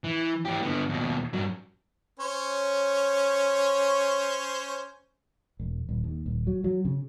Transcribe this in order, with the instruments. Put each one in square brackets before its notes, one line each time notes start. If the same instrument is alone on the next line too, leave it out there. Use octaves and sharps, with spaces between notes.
[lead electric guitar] E3
E3 G4
D3 B3
D#2 B2
G2 F#3
[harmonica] C#4 C5 C#5
[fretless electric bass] E1
D#1
D#2
D#1
F#3
F#3
C#3